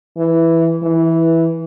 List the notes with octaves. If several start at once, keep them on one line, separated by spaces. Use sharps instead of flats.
E3
E3